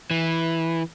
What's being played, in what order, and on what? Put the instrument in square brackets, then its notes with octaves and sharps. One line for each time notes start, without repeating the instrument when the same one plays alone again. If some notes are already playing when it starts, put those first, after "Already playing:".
[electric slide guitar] E3